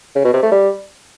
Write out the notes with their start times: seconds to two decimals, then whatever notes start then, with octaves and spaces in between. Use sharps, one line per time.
0.15 C#3
0.24 B2
0.33 C3
0.43 A3
0.52 G3